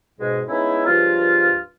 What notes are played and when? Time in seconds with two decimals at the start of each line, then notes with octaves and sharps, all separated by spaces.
0.20 G#2 B2 G#3
0.49 G#3 B3 C#4 D#4 E4
0.86 C#2 G2 F3 F4